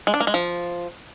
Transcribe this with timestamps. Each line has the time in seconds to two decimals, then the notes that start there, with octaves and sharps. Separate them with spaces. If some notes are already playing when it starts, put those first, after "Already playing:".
0.07 G#3
0.14 D4
0.20 A#3
0.27 G#3
0.34 F3